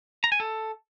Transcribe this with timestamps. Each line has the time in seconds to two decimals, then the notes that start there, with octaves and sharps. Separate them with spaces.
0.24 A#5
0.32 G#5
0.40 A4